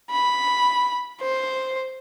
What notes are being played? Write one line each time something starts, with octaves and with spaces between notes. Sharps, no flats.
B5
C5